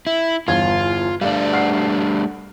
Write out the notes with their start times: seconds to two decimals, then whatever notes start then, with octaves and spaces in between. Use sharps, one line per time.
0.07 E4
0.48 G1 E2 F4 G#6
1.21 G3 A3 D4 D5 F5
1.52 F#5 F6 C7